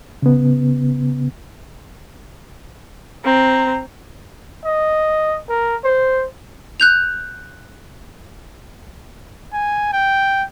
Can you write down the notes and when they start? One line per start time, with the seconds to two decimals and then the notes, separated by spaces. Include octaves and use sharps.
0.22 C#3 B3
3.25 C4 A#5
4.65 D#5
5.49 A#4
5.84 C5
6.80 F#6 G6 F7
9.53 G#5
9.93 G5